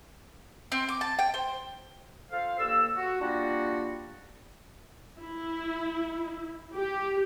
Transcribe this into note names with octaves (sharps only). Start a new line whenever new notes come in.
C4
D6
A5
G5
C5
F4 A4 C5 F5
G2 A#3 A4 E6
F#4
G3 A#3 D4 F4 F#4
E4
G4